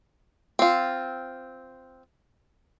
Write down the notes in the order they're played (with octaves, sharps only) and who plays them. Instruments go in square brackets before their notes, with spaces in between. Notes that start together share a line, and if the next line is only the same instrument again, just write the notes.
[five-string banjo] C4 F4